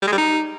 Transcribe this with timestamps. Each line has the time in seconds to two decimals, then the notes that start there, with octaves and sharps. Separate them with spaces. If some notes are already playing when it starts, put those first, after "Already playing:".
0.02 G3
0.07 G#3
0.13 G3
0.18 D#4